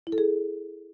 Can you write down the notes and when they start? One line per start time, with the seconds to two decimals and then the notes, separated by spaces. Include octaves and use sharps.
0.07 E4
0.12 A4
0.18 G#4